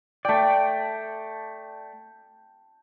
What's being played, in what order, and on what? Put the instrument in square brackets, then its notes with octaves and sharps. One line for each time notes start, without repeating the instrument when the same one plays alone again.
[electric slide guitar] A3 D5 [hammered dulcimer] G5 A5